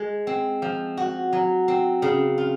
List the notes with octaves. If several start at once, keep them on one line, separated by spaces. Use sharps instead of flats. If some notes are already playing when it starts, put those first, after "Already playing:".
Already playing: G#3
C4
F3
F#4
F#3
C4
C#3
F4